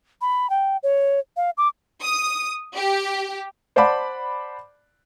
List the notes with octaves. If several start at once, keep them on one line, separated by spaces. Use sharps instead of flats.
B5
G5
C#5
F5
D6
D#6
G4
C5 D5 F#5 A5 B5 D6